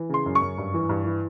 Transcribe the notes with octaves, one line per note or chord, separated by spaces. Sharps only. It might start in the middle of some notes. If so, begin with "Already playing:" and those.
Already playing: E3
C#3 C6
F#2
C#6
F#2
G2
E3
G2
E3